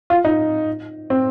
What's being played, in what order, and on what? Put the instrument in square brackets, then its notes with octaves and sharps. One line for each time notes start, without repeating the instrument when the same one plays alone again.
[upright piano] F4
D#4
C4